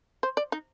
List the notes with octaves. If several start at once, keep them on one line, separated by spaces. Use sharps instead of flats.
C5
D5
D#4